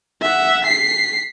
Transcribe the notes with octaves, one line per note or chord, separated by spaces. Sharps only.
E5 F#5
B6 C7